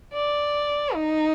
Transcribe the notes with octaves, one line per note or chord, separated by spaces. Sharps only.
D5
D#4